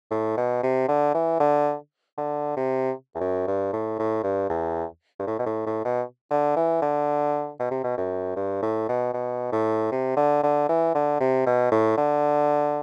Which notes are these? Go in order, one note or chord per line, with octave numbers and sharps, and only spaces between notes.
A2
B2
C3
D3
E3
D3
D3
C3
E2
F#2
G2
A2
A2
G2
E2
G2
A2
B2
A2
A2
B2
D3
E3
D3
B2
C3
B2
F#2
G2
A2
B2
B2
A2
C3
D3
D3
E3
D3
C3
B2
A2
D3